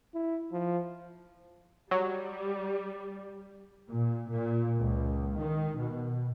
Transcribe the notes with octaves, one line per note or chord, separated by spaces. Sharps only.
E4
F3
F#3 G3
A#2
A#2
C#2
D#3
B2